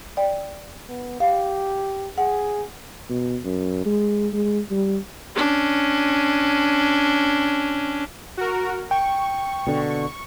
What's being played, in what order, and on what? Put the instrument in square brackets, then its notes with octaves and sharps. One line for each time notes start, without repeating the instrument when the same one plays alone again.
[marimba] D5 G5
[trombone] B3
[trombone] G4 [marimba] F5
[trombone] G#4 [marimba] F#5
[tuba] B2
F#2
G#3
G#3
G3
[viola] C#4 D4
[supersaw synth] F#4 A#4
[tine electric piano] G5 [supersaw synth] C#6
[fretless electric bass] B2 D3